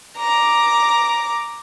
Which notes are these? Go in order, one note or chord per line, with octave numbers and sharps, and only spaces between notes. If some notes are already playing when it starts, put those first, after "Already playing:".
A#5 D6